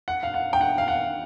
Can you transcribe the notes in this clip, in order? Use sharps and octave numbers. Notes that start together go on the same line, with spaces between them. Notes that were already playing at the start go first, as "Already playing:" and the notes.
F#5
F5
F#5
G5
F#5
F5
F#5